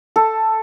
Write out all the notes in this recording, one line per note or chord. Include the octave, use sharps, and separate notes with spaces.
A4